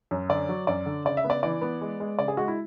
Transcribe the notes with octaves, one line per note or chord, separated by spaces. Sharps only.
F#2
D3 D5
F#3
F#2 D5
D3
C#3 D5
E5
B3
D5
E3 D5
B3
G#3
G#3
C#3 D5
G#4
G#3 F#4
E4